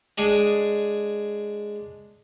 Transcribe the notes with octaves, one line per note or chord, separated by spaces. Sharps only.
G#3 D4 G#4